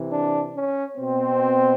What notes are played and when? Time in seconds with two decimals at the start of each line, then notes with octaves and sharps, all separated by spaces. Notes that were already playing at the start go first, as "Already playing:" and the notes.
Already playing: C3 E3
0.12 D4
0.55 C#4
0.98 B2 C4